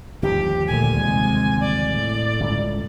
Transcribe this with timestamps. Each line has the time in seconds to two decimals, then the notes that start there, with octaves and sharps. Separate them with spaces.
0.22 G1 D#2 F3 G4
0.67 D2 A#2 G#5
1.00 C3 G#3
1.61 D5
1.91 A2
2.40 G1 C#2